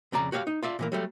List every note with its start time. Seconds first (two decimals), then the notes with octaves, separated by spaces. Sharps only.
0.12 F2 C#3 D5 A#5
0.32 F#4 G4 C#5 E5 F5
0.47 D#4
0.63 F4 D5 E5
0.79 A#2 E3 A#3
0.92 F#3 G3 A3